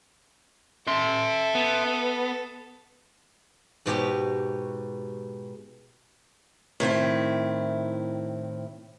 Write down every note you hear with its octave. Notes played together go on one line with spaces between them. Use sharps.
A4 E5 C6
B3
G#2 B2 G4 C#5
A2 D#3 C4 E4